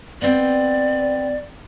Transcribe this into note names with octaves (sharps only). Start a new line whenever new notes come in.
B3 C4 D5 G5